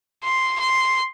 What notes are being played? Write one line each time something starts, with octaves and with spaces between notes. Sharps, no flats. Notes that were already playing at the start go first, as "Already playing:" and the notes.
C6
C6